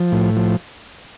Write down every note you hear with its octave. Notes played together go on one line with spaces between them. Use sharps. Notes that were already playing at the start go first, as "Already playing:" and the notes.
Already playing: F3
A2
F3